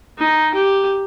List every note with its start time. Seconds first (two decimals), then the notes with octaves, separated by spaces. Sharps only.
0.18 D#4
0.54 G4